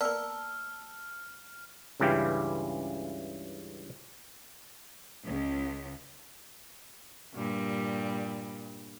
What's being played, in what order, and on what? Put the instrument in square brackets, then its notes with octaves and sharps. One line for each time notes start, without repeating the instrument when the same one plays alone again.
[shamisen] A#3 B3 [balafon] D5 [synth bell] A5 E6 [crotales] F6
[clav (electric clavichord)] C#2 G2 C#3 E3 G4 F5
[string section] C#2
[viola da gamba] G2 A#2 G3